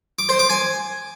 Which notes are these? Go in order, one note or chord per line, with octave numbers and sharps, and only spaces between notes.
D6
C5
D6
G#5